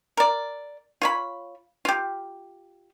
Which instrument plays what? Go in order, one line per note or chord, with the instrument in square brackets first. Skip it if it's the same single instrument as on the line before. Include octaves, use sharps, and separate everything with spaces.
[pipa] A#4 D5
F4 C#5 B5
F4 G4